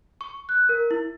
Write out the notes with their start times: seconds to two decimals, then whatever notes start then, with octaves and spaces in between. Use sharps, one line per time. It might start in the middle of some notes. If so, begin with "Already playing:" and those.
0.21 C#6
0.49 F#6
0.69 A#4
0.91 E4